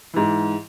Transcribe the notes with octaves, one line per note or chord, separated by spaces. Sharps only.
G#2 E3